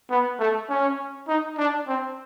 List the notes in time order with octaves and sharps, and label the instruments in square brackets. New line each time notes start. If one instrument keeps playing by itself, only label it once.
[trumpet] B3
A3
C#4
D#4
D4
C4